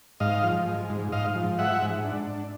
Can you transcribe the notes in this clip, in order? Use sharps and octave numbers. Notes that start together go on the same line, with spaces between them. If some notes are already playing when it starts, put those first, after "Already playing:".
G#2 D#5 F5
F3
G#3
G#2
G#2 D#5 F5
F3
G#3 E5 F#5
G#2
D4